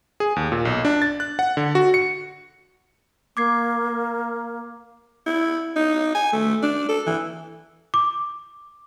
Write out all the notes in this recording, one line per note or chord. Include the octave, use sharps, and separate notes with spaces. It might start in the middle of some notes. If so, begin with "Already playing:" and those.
G#4
D#2
A#2
B1
D4
A6
F#6
F#5
D3
F#4
C#7
A#3 D6 G#6 C7
E4
D#4
G#5
A3
D4
A4
E3
D6